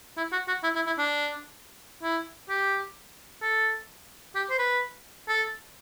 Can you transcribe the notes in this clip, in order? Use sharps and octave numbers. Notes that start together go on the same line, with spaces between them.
E4
F#4
F#4
E4
E4
E4
D4
E4
G4
A4
G4
C5
B4
A4